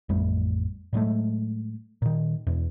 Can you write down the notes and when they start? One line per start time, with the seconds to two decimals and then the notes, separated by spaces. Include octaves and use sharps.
0.09 A1 F2 G3 A3
0.93 A2 F#3 G#3 A3
2.02 A#2 D#3
2.47 E2 B2